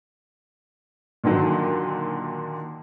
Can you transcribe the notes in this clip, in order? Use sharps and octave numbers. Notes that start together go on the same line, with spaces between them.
A#2 D3 D#3 F#3